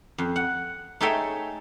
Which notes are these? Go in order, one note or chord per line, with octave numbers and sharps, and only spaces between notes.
F2
F#5
A3 D#4 G#4 C#5 E5 G5